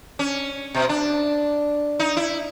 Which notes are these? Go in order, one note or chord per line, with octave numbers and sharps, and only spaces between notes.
C#4
B2
D4
D#4
E4